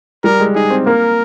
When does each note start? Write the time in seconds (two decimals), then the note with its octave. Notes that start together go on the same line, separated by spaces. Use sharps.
0.24 G3 A#4
0.40 G#3
0.55 D#4 G#4
0.70 C4
0.86 A#3 A#4